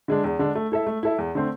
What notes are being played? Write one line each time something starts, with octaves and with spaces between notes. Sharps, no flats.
D3 G#3 D4
E2
D3 G#3 D4
A3
E4 A4 E5
A3
E4 A4 E5
E2
D3 A3 C4